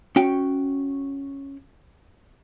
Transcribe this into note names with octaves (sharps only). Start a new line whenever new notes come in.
C#4 F#4 G5